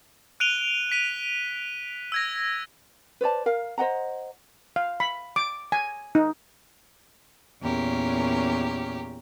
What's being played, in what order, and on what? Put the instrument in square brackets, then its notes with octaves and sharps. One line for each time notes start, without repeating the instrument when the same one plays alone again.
[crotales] F#6 D7 D#7 F7 G7
B6 D#7
E6 G#6 A#6
[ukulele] B4 C5 D5 A5
A#4 F5
C5 D#5 F#5 A#5
[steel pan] F5
B5
D6
G#5
D#4
[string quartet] E2 A#2 C#4 G4 A#4